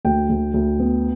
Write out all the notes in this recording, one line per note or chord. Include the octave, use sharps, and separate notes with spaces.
D2 G5
D2
D2
B3